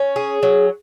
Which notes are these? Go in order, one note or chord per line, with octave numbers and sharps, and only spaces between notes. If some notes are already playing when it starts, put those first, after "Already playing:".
Already playing: C#4
G#4
F#3